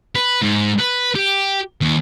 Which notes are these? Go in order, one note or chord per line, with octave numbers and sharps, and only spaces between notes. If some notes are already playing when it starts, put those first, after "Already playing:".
B4
G#2
B4
G4
D#2